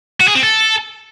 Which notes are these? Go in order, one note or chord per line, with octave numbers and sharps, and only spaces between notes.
F#4
G#4
C4
A4